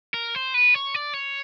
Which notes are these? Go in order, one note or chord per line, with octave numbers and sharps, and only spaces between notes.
A#4
C5
B4
C#5
D5
C#5